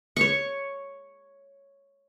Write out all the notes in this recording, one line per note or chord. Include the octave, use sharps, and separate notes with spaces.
C#5 C#6